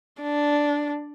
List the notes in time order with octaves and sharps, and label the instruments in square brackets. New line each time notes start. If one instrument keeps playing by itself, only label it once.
[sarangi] D4